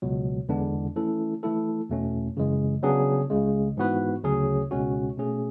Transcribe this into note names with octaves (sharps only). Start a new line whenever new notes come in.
C#2 B2 F#3
E2 D3 G#3 B3 D4
E3 A3 C#4 E4 A4
E3 A3 E4 A4
E2 B2 A3 C#4
F#2 C#3 E3 G#3
C#3 F#3 B3 D4 G#4
C#2 C#3 G#3
G#2 E3 B3 F#4 B4
D2 C#3 F#3 C#4 G#4
C#2 B2 G#3 C#4 F#4
B2 A3 C#4 G#4